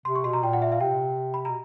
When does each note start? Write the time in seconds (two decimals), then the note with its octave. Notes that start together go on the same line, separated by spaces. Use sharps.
0.05 C3 C6
0.16 C#6
0.24 B2 C6
0.33 A#5
0.43 A#2 G5
0.53 F#5
0.62 E5
0.72 F5
0.80 C3 G5
1.34 B5
1.45 B2 A#5